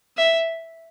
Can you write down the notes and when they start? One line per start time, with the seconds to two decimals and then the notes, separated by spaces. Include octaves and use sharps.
0.17 E5